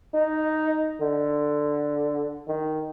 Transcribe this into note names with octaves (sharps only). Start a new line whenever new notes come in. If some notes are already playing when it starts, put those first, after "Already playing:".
D#4
D3
D#3